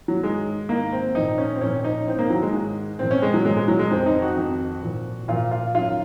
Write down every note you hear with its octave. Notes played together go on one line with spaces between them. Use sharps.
F#3
G#2 D#3 G#3
G#2 D#3 A#3
C4
A#2 F3 D#4
C#4
C4
A#2 F3 C#4
D#4
G#2 D#3 C4
A#3
F#3
G#3
G#2 D#3
A#2 F3 C4
C#4
G#3
F#3
A#2 F3 G#3
G#3
F#3
G#3
F2 D#3 C4
D#4
F#4
F2 D#3
A#2 F3
A#2 F3 F4
F4
F#2 D#3 F4